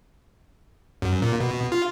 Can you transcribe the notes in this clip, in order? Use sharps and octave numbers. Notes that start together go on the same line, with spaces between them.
F#2
A#2
B2
F4